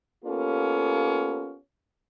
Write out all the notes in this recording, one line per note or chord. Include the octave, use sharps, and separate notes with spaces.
A#3 B3 C#4 F4 G4 A4